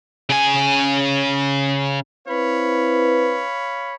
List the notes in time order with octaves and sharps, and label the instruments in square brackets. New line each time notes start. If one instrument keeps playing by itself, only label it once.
[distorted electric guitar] C#3 G#5
[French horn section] C4 E4 B4 [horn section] C#5 F5 B5